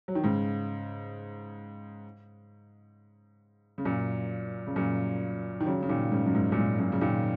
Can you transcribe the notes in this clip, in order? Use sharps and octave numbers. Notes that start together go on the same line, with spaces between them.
F#3
D#3
G#2 C#3
C#3
F#2 A#2
C#3
F#2 A#2
D#3
C#3 F#3
C#3
A#2 D#3
G#2 C#3
F#2
G#2
A#2
G#2
F#2 A#2
C#3
A#2 D#3